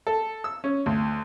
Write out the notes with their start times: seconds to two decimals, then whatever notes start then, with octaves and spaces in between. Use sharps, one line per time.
0.07 A4
0.44 E6
0.64 C#4
0.86 D2